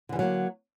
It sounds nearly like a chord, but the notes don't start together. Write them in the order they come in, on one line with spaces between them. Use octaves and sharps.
D3 E3 G3 F#3 A#3